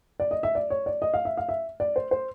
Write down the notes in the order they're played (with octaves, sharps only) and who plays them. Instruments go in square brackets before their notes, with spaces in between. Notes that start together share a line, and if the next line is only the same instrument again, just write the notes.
[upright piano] D5
D#5
E5
D5
C#5
D5
D#5
F5
E5
F5
E5
D5
C5
C5